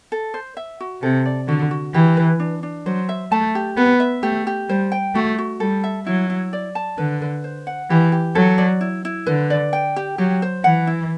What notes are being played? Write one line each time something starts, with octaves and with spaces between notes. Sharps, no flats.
A4
C5
E5
F#4
C3 A4
D5
D3 F#4
F#4
E3 G4
B4
D4
D4
F#3 C5
E5
A3 A5
G4
B3 B4
E5
A3 G4
G4
G3 C5
G5
A3 F#4
F#4
G3 A4
E5
F#3 E4
E4
D5
A5
D3 B4
B4
C5
F#5
E3 G4
G4
F#3 A4
D5
E4
E4
D3 B4
D5
G5
G4
F#3 G4
C5
E3 F#5
E4